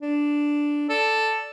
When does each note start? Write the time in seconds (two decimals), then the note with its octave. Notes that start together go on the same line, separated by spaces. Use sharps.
0.01 D4
0.89 A4 D5